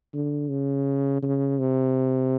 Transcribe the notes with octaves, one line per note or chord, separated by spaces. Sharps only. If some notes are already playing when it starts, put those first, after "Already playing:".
D3
C#3
C#3
C3